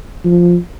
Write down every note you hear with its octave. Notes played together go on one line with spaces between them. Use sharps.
F3